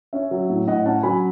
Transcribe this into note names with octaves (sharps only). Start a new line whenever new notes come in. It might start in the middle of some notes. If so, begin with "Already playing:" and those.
C#4 C#5 E5
F#3
A2
A2 D#5 F#5
C#4 F#5 A5
F#3 G#5 B5